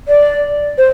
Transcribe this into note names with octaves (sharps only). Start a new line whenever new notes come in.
D5
C5